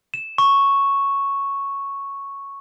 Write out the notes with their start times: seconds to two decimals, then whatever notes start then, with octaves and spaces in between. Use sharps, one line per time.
0.14 E7
0.38 C#6